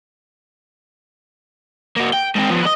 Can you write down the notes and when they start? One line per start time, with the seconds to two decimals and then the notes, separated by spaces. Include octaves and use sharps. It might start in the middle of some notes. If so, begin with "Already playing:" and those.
1.97 A#3 F#4
2.13 G5
2.36 G#2 C4
2.50 F3 B3
2.63 B4 D#5